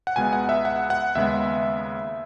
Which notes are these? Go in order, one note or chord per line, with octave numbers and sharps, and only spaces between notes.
F#5
C#2 B2 G#3 B3 G#5
F#5
E5
F#5
F#5
D#2 C#3 G#3 B3 E5